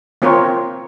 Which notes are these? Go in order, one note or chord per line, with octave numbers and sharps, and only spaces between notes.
A#3 C4 F4 A#4 C#5